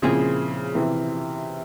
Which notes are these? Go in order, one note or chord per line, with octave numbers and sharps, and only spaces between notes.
A#2 C#3 F3 C4 E4 G#4
C3 E3